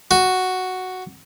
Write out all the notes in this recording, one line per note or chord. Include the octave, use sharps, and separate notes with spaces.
F#4